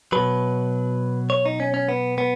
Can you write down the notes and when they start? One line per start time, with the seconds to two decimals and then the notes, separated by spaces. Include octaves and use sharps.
0.12 B2 F#3 B4
1.30 C#5
1.46 D#4
1.60 C#4
1.74 C#4
1.89 B3
2.18 B3